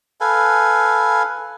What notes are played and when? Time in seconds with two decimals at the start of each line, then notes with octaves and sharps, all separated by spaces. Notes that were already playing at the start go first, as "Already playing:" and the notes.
0.21 A4 B4 F5 G#5